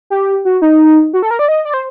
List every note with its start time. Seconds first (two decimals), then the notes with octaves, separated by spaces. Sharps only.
0.10 G4
0.45 F#4
0.62 D#4
1.13 F#4
1.22 A4
1.31 A#4
1.39 D5
1.48 D#5
1.65 D5
1.74 C5